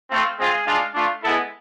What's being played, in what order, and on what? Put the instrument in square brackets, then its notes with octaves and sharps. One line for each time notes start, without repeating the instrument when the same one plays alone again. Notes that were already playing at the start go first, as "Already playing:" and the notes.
[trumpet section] A3 C4 F4
G#3 C4 F4 G#4
G#3 D4 F4
A3 D4 F4
G#3 B3 E4 A4